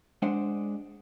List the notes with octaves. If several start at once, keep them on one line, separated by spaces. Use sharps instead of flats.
G#3 D4 C5 F#5